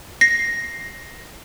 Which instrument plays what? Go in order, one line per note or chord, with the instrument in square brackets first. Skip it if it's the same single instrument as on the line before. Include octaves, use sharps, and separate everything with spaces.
[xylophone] A#6 C7